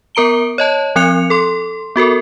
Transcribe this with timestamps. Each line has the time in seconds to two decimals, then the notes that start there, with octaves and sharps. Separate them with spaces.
0.15 B3 A#4 A#5 D7 G7
0.58 C#5 D#5 A5
0.96 F3 C4 F#6 C#7 F7
1.30 A4 C6
1.96 B3 F#4 A4 A#4